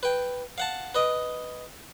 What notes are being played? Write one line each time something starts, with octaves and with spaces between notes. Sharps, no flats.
B4 G5
F5 F#5 A5
B4 D#5